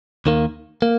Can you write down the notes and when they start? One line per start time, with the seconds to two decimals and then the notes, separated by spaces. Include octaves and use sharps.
0.26 D#2 D#3 A#3
0.82 A#3